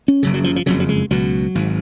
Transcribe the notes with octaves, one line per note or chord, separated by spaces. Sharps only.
C#4
F#1 F#2 C#3
F#3
F3
F3
F#1 F2 C#3 F#3
F#3
G#3
C#2 B2 F#3
G#1 G#2